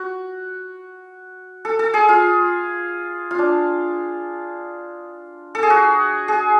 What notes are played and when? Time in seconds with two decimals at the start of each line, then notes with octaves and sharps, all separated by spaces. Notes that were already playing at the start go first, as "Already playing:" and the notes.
Already playing: F#4
1.65 A4
1.79 A4
1.94 G#4
2.09 F4
3.31 F4
3.39 D4
5.55 A4
5.63 G#4
5.70 F#4
6.28 G#4